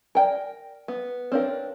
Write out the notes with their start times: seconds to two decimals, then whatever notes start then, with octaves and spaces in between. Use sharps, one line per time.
0.15 A#4 D5 G5 G#5
0.88 B3
1.32 C4 D4 A#4 B4 C#5 F5